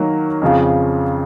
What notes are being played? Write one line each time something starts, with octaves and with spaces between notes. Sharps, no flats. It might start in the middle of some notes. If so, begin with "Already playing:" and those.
Already playing: D#3 F#3 A#3
F2 C#3 F3